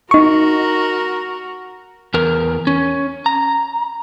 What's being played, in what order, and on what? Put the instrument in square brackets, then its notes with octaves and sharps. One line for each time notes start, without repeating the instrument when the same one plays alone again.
[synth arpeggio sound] D#4 C#6 [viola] F#4 A#4
[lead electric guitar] E2 A#4
C#4
A#5